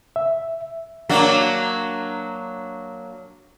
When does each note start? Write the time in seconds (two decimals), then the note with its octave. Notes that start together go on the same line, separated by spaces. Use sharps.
0.16 E5
1.09 F#3 A#3 D4